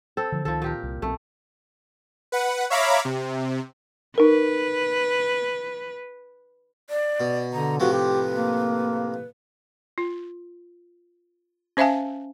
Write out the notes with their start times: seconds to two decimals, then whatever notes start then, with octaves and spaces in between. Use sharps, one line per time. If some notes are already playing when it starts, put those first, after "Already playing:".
0.17 C4 A4
0.32 D3 F3
0.45 C#2 D#3 F3 A4
0.62 A#2 G4 A#4
0.83 C2
1.02 B1 A3 C4
2.32 B4 F#5
2.70 C#5 E5 F5 A#5 B5 D6
3.05 C3
4.18 D#4 A#4 B4
6.90 D5
7.20 B2
7.53 D3 A#5
7.80 A2 C3 F3 F#4 B4
7.92 G4
8.33 A#3
9.98 F4
11.77 C#4 C5 E5 F5 G#5 A5